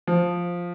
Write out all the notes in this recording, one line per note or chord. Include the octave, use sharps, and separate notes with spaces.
F3